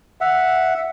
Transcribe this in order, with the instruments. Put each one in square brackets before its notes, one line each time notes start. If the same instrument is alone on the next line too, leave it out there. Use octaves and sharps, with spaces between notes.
[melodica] E5 F#5